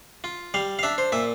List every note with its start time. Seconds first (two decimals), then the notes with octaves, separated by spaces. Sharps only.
0.24 F4
0.54 G3 F5
0.79 F5
0.83 D4 E5
0.98 C5
1.12 A#2 E5